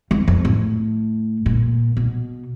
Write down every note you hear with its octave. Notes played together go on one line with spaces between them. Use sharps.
E2
F2
A2
A#2
B2